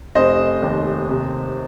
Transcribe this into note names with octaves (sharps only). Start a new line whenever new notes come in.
F1 C5 D#5
D#2
C3